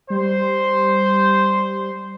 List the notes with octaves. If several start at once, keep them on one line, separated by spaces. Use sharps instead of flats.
G3 C5